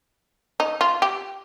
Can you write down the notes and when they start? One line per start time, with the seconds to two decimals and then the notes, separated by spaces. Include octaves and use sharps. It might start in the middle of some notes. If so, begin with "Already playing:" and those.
0.60 D#4
0.81 F4
1.02 G4